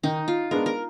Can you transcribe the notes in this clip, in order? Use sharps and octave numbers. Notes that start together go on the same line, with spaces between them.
D#3 D#4
F4
G#3 B3 D4 A#4
A#4